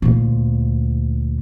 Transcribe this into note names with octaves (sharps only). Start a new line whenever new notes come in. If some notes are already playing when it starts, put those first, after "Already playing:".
D2 A#2